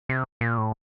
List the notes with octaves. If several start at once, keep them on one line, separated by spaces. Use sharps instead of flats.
C3
A#2
A2